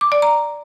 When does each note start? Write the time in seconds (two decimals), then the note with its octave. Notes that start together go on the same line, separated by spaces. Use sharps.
0.01 D6
0.12 D5
0.22 A#5